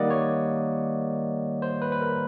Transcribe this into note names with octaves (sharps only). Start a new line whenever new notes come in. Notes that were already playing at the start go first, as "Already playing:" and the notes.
Already playing: D#3 G3 A#3 D5 D#5 F#5
C#5
C5
B4
B4
A#4